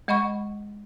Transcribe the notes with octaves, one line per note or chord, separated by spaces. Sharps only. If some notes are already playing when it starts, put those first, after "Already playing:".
G#3 D#5 F#5 B5 C#6